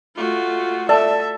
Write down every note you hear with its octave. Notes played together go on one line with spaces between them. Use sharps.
A3 F4 F#4
A4 D5 E5 A5